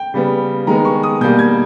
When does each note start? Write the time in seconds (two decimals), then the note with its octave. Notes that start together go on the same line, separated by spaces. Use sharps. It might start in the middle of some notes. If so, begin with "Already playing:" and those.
Already playing: G5
0.14 C#3 G3 B3
0.67 D#3 G#3 B3 A#5
0.85 C#6
1.03 D#6
1.21 B2 G3 A#3 G6
1.39 G#6